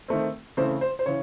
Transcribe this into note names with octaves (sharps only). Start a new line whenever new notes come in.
D#3 A3 C4
C#3 E3 A3 C4 C5
C5
C5
C#3 E3 C#5